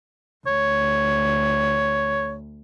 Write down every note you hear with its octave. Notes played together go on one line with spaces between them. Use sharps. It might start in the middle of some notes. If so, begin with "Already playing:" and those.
D2 C#5